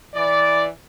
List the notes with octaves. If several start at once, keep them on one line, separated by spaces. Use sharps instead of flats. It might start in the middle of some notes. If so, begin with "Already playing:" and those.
E3 D5